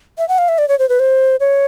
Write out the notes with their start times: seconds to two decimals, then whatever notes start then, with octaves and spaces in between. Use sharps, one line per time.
0.18 E5
0.29 F#5
0.38 F5
0.49 E5
0.58 D5
0.69 C#5
0.79 C5
0.89 B4
1.00 C5
1.40 C#5